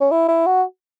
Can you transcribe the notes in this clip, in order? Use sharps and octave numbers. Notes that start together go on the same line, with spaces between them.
C#4
E4
E4
F#4